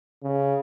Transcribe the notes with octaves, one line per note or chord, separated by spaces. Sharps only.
C#3